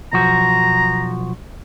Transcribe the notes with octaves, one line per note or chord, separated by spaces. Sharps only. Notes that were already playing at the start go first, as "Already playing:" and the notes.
B1 F3 F#4 A#5